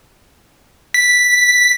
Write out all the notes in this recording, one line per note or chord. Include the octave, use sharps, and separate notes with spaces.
B6